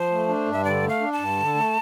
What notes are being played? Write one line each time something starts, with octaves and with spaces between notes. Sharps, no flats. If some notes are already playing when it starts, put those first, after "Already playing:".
Already playing: F3 C5
A3
D4
G2
E5
D3 D5
A3
F5
D4
A5
G2
D3
A3